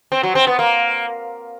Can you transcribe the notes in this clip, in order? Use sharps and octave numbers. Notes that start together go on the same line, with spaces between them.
C4
F#3
C4
B3
A#3